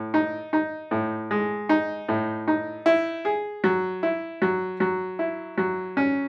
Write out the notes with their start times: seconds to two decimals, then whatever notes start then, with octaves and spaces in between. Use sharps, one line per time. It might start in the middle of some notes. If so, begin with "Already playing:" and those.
Already playing: A2
0.14 D#4
0.53 D#4
0.91 A2
1.31 G#3
1.69 D#4
2.09 A2
2.48 D#4
2.86 E4
3.25 G#4
3.64 F#3
4.03 E4
4.42 F#3
4.80 F#3
5.19 E4
5.58 F#3
5.97 C#4